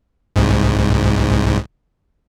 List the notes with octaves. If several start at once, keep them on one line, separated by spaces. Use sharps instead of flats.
C2 G#2